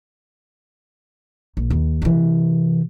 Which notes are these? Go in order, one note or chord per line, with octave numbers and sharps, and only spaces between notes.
A#1
D#2
C3 E3